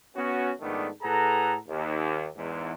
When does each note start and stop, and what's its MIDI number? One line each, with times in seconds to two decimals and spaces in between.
0.16 0.51 59
0.16 0.51 61
0.16 0.51 66
0.61 0.88 44
0.61 0.88 51
0.61 0.88 53
0.61 0.88 57
0.61 0.88 59
0.61 0.88 62
1.03 1.55 45
1.03 1.55 68
1.03 1.55 69
1.03 1.55 71
1.03 1.55 78
1.03 1.55 82
1.68 2.28 39
2.36 2.73 40
2.36 2.73 44